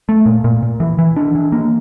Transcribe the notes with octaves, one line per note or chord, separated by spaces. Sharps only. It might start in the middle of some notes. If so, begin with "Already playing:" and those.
A3
A#2
A#2
A#2
E3
E3
D4
E3
A#3